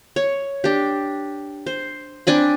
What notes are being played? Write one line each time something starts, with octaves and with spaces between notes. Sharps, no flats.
C#5
D4 G4
C5
C4 D4 G#5 B5